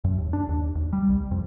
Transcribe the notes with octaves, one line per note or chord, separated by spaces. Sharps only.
F#2
D#2
D4
D#2
D#2
G3
C2
F2